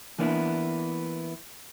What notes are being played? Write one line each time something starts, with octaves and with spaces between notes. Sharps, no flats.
E3 A#3 B3 D4 E4